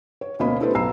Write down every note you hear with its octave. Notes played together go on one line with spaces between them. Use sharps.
C#5
D2 B2 A#3 C#4 D#5 B5
D4 E4 G4 A4 B4 C5
B1 A#5 E6 C7